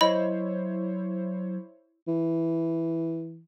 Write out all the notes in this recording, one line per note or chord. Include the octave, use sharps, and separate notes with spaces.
F#3 E4 C5 C#5 D#5 B5
E3